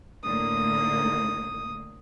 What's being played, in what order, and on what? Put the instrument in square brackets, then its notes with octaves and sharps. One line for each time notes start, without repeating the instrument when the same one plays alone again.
[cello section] A2 D3 A#3 [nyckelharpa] D#6